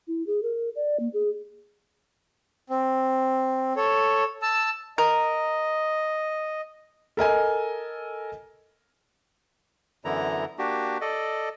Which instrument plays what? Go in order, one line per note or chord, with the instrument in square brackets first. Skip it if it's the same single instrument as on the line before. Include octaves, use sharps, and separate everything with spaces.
[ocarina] E4
G#4
A#4
D5
A#3
G#4
[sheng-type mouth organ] C4
A4 C#5
A5 E6
[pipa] A#4 [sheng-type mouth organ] D#5
[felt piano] A4 A#4 D#5 G#5
[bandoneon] F#2 D3 E3 B3 E4 A#5
A#3 D4 F#4 G4
A4 D5 D#5